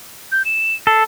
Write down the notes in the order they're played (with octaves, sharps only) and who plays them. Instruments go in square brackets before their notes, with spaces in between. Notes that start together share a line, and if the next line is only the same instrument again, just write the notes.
[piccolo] G6
E7
[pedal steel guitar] A4 [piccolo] C7